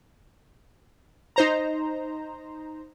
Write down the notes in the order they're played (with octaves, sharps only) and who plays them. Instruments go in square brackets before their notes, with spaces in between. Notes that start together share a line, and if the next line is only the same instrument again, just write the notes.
[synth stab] D#4 C5 A#5